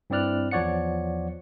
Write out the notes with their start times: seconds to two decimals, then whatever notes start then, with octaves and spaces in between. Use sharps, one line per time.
0.10 G2 C4 E4 D5 F6 F#6
0.51 E2 F3 C#5 D5 F#5 C#7